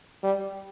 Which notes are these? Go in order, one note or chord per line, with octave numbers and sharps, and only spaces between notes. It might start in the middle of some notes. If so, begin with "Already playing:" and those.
G3